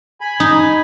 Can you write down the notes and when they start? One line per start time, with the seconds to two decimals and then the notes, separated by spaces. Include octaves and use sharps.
0.21 G#5 B5
0.40 D#4